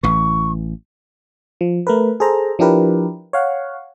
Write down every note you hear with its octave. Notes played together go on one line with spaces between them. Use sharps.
A1 E3 C#6
F3
A3 A#4 B4
G#4 A4 C5 A#5
F3 D4 E4 G4 A#4 B4
C#5 F5 F#5